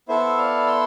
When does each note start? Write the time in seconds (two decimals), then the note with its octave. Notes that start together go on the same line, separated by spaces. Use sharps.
0.08 B3 E4 A4 C5 E5
0.38 D5 F5
0.67 C6 E6